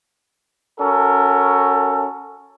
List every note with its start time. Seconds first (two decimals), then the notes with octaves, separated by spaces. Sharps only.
0.79 C#4 F#4 A4 A#4